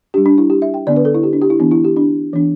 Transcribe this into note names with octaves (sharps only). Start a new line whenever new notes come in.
D4 G4
G3
D4
E4
G4
E5
G5
D3 B3 D4 D5
B4
A4
E4
G4
D4
G4
E4
E3 B3 D4
E4
G4
D4
E3 B3 D4